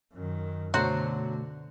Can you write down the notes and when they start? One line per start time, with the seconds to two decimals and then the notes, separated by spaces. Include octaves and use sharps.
0.14 F#2 D#3
0.74 B2 D3 F#3 A3 F#4 C5